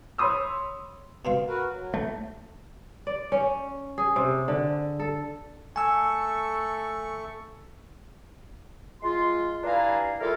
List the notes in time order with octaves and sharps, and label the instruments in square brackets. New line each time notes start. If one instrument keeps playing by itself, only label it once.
[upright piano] C#5 B5 C6 D#6 E6
[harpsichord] B2 C4 F5
[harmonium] F#4 A#4 B4
F#3
[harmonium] A2 [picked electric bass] A3
[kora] D5
C#4
G#4
C3
D3
A4
[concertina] A3 A4 C#6 [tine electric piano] G#5 E6
[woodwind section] G#3 F4 C6
G2 D4 E4 F5 G#5 A#5
G3 E4 F4 A4 A#4